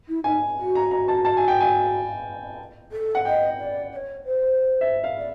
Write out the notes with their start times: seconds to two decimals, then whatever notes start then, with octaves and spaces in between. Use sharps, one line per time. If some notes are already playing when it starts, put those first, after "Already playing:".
0.08 E4
0.24 D#4 G#5
0.58 F#4
0.75 A#5
0.91 A#5
1.08 A5
1.25 A5
1.37 G#5
1.48 G5
1.61 G#5
2.92 A4
3.15 F#5
3.25 D#5 G5
3.59 D5
3.93 D5
3.96 C#5
4.25 C5
4.81 E5
5.04 F5
5.18 D5